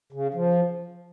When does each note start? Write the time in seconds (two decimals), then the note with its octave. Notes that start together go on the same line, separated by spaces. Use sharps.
0.12 C#3
0.34 F3